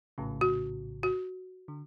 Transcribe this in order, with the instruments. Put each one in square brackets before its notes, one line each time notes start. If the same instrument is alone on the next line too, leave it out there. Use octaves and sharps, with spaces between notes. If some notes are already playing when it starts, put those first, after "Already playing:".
[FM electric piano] A#1 A2 C#3
[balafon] F#4
F#4
[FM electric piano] D3